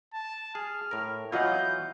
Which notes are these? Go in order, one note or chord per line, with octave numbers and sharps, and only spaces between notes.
A5
G#4 F6
A2 A#4
E3 F#3 B3 F4 D#5 F#5 G6